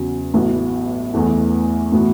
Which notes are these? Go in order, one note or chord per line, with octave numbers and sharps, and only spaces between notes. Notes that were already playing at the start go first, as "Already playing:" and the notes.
Already playing: E2 C#3 F#3
A1 A2 F#3 B3
E2 E3 A3
A2 E3 B3 F#4